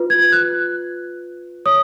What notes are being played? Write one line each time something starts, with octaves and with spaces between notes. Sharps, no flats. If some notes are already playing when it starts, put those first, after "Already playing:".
Already playing: F4 B4
G#6
F#6
C#5 D#6